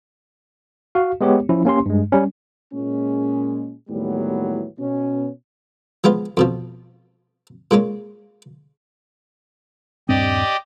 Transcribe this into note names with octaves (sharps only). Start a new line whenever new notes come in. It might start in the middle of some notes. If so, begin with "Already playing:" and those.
F#4 F5
G#3 B3 G4 C#5
F3 C#4 E4
A#3 C#4 G4 C6
G2 G#3
G3 C#4
A#2 G#3 C#4
D#2 A2 E3 F#3 G3 B3
B2 C#4
F3 G#3 B3 F4
F2 B2 F3
A#2 G#3 A#3 C#4
D#1 G2 C4 G4 D5 D#5